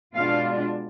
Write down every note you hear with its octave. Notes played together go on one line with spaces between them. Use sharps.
B2 G#3 D4 F4 F5